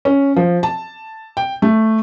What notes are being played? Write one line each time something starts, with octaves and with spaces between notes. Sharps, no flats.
C#4
F3
A5
G5
A3